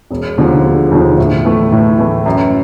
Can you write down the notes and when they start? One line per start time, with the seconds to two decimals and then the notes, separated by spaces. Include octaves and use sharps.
0.11 E1
0.37 D#2 D3 F3
0.64 E1
0.91 D#2 D3 F3
1.18 A2
1.45 E3 A3
1.72 A2
1.98 E3 A3
2.26 F#2